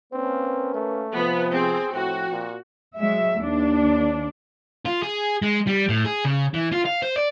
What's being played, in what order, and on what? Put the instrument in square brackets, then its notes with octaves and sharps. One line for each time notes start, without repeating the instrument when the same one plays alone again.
[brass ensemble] A#3 C#4 B4 [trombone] C4
[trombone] A3
[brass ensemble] C3 F3 [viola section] B3
[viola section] C4 [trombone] G#4
[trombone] A2 [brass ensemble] F3 G5 [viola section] F#4
[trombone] A#2
[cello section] F#3 G#3 E5
D#2 D4
[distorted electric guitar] F4
G#4
G#3
G3
A2
G#4
C#3
E3
F4
F5
C5
D5